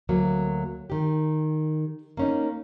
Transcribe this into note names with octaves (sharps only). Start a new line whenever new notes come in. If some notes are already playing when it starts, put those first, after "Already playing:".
D2 F#3 A#3
D#3 G4
A#3 C#4 D#4